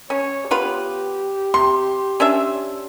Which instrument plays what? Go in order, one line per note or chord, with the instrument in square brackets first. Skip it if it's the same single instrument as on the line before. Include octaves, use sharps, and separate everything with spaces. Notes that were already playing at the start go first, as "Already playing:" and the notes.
[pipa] C#4 [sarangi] C#5
[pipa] B3 F4 B4 [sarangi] G4
[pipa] C3 [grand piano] C6
[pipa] C#4 D4 E5